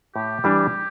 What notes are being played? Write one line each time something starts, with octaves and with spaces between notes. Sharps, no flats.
A2 G4
E3 G3 D4